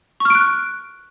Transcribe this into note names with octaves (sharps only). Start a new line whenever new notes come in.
C#6 F6 F#6 D7